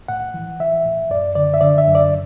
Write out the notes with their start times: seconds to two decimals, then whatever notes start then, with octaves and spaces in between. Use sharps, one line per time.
0.08 A2 F#5
0.34 E3
0.60 E3 E5
0.85 A2
1.10 F#2 D5
1.35 D3 D5
1.54 E5
1.61 D3 D5
1.78 E5
1.87 F#2
1.95 D5